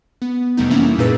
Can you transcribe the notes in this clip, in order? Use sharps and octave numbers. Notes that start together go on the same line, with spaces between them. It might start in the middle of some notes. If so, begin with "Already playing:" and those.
B3
F2 C3 G3 A3 B3 D#4
C3 E3 A#3 B3 C#4 E4
F#2 A#2 D#4 G#4 B4 E6